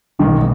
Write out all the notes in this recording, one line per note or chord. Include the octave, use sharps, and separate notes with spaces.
B1 B2 D#3 G#3 C#4